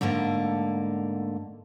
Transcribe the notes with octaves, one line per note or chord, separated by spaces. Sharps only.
G#2 D3 A3 A#3